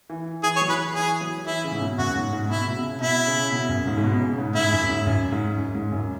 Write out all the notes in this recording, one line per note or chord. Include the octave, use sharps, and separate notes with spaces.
E3
E3 G#4
C#5
F#3
E3 B4
E3 G#4
F#3
E3 E4
C#3
G#2
B2
F#2 F#4
B2
G#2
G#2
B2 E4
B2
C#3
B2 E4
C#3
B2
F#2
G#2
G#2
B2
C#3
G#2
G#2 E4
F#2
G#2
F#2
G#2
F#2
G#2
F#2